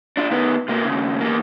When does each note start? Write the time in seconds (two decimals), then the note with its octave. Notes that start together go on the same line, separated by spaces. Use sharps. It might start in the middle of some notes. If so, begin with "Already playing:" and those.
0.17 D4 F4
0.31 D#3 B3
0.68 C3 A#3
0.85 D#2 C#3
1.20 E2 A#3